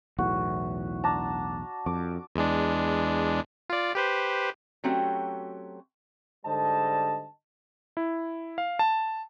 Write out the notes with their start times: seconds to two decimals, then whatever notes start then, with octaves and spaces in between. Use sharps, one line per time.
0.18 B1 E2 A2 F#4
1.04 D4 A5 A#5
1.86 F2 D6
2.35 E2 G#3 D4
3.70 F4 D5
3.95 G4 B4 C5
4.84 F#3 A3 C4 C#4 F#4 G4
6.45 G#2 D3 G3 C5 D#5 A5
7.97 E4
8.58 F5
8.79 A5